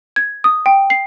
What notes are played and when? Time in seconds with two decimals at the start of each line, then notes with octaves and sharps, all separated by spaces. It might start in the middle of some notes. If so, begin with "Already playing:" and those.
0.16 G#6
0.44 D#6
0.66 G5
0.90 C7